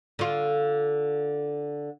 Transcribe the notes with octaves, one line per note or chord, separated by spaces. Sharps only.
D3 F4